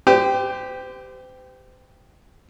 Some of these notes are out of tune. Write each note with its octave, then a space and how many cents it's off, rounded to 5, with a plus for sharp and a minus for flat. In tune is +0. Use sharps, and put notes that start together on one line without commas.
G4 +0 C5 -40